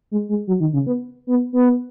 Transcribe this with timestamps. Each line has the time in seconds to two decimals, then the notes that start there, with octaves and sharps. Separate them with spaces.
0.11 G#3
0.29 G#3
0.47 F#3
0.60 D#3
0.73 C#3
0.87 B3
1.27 B3
1.53 B3